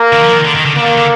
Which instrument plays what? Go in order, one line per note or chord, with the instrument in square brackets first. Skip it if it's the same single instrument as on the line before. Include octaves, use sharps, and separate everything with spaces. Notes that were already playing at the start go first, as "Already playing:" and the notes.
Already playing: [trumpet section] A#3
[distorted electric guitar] D#3
F3
D#3
D3
D#3
D3
[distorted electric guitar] D3 [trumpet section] A#3
[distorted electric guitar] D#3
D3